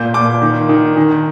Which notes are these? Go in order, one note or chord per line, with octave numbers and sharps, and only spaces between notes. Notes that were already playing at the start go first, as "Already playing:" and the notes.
Already playing: A#2 G6
A#2 D6
D#3
D#3
D#3